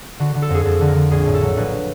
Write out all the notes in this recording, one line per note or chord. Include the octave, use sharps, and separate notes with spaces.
D3 F#4
D3
A4
F2 G#4
F2 A4
D3
A#4
D3
A#1 G#4
A2
A4
F#3
A#1 B4